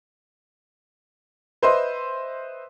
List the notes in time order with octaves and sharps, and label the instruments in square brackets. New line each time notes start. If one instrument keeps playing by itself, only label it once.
[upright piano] B4 C5 D#5 E5 C6